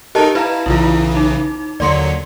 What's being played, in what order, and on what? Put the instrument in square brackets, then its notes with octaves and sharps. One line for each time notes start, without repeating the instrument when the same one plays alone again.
[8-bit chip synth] D#4 A4 A#4 [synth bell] G4 D#5 A5
[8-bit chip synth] E4 [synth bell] B4 F5 A#5
[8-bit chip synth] B1 C#3 E3 [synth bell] E4 F4
[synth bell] D#4
[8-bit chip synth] D#2 D3 F#3 [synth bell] D5 C6 C#7